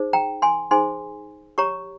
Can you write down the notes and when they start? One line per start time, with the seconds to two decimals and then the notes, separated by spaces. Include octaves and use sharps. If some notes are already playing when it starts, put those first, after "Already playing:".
Already playing: D#4 G#4 C5
0.13 G5 A#5
0.42 G#5 C6
0.71 D#4 G#4 C5 G#5 C6
1.58 G4 C#5 A#5 C#6